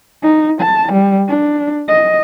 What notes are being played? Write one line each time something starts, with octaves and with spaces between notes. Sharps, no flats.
D#4
A5
G3
D4
D#5